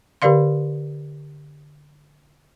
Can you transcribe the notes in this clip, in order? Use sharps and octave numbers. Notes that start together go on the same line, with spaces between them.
D3 G4 A#4 D5 F5 C6